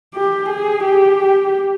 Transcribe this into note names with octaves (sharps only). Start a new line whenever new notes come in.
G4
G#4
G4